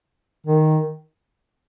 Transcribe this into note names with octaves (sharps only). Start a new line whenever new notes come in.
D#3